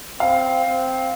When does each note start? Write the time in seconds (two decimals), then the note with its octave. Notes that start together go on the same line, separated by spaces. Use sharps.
0.20 C4 F5
0.65 C4